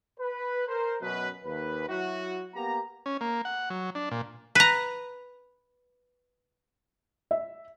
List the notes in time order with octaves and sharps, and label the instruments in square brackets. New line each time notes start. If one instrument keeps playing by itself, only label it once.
[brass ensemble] B4
A#4 C5
F#2 B2 B4
D#2 B4
F#3 E4 F#4
A#3 B3 G4 A#5
[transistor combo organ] C#4
A#3
F#5
F#3
D4
A#2
[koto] B4 A#5
[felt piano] E5